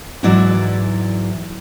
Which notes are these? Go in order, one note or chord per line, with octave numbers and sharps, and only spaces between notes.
G#2 E3 F#3 E4 D5